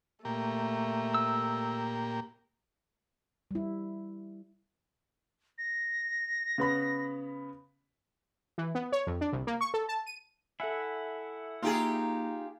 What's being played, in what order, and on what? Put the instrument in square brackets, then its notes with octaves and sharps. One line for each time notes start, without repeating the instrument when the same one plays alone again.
[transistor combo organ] A#2 A#3 G4 [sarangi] A3
[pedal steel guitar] E6
[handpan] G3 E4
[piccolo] A#6
[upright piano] C#3 B3 B5
[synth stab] E3
B3
C#5
F2
D4
C2
A#3
C#6
A4
A5
D#7
[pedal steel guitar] E4 F#5 [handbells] A4 E5 G#5
[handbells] A#3 A#5 [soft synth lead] D#4 [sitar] F4 G4 G#4